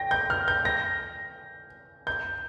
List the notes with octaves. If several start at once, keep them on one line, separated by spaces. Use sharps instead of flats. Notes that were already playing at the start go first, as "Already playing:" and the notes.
Already playing: G5 A#6
G6
F6
G6
A#6
G6